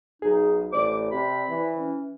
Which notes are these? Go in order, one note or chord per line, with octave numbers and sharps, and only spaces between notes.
B1 D#4 G#4
A1 C5 D5 D6
C3 B5
E3
C#4